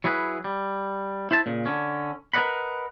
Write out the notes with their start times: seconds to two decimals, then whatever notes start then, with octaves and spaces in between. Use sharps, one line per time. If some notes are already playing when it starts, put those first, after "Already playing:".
0.04 F#3 E4 G#4 B4
0.44 G3
1.31 E4 C5 E5 A5
1.46 A#2 C#3
1.66 D3 C#4
2.33 A#4 B4 D5 D#5 F#5 B5